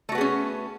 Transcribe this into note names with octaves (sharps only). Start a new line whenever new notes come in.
A3 B3 C#4 F#4 G#4